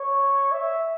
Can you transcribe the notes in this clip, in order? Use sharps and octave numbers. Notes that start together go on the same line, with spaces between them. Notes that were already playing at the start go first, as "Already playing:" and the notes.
Already playing: C#5
E5